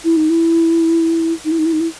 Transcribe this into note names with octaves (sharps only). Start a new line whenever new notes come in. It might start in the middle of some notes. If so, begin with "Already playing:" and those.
E4
D#4
E4
D#4
E4
D#4
E4
D#4
E4